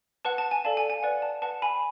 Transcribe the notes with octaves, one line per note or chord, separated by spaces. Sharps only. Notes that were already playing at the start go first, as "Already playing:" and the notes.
B4 F#5 A5
A5
G#5
A4 D5 F5 A5
G#5
G#5
B4 D5 F#5
A5
B4 F#5 A5
G#5 B5